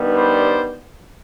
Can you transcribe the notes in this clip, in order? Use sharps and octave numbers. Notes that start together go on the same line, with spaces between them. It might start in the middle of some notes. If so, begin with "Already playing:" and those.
Already playing: G2 D#3 G3 B3
C5 D5